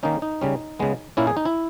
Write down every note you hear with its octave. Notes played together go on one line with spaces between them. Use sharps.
D#3 A#3 C#4 D#4
D#4
C#3 G3 C#4
C#3 G#3 B3
A#2 A#3 C#4 E4
G#4
D#4
E4